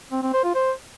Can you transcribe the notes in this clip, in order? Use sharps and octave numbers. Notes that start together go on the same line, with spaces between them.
C4
C4
C5
F4
C5